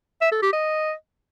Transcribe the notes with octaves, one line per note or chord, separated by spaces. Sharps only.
E5
A4
G4
D#5